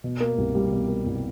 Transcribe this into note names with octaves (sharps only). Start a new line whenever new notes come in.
B2
A#3
C2
G3
B2
A#3
C2